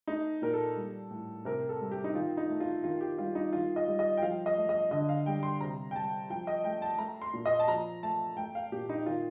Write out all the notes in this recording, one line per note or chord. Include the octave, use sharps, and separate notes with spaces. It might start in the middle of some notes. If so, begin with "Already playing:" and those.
A3 D#4
A#2 A#4
A4
G3
A2
C3 A#4
A4
G3
G4
D#4
D#3 F4
D#4
A3
F4
D#3 F4
G4
G3 F4
D#4
D#3 F4
D#5
G3
D#5
G5
F3 F5
D#5
A3
D#5
D3 D#5
F5
G3 G5
C6
C3 A#5
G5
G3 A5
F3 G5
D#5
A3 G5
A5
A3 A#5
C6
A#2
D#5
A5
F3 A#5
A3 A5
A3 G5
F5
A#2 G4
D#4
D#3 F4